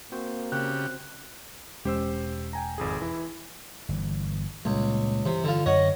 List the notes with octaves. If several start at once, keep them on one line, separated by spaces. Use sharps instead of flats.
A#3 C4 F#4 C5
C#3 G4 F#6
E1 G#3 C#4 G4 C5 E6
G5 G#5 A#5
G#1 F2 G#4
E3 E4
G1 E3
C#2 A#2 G3 G#3
G2 C3 E3
D3 F4
F#2 D3 C#5 D#5 F#5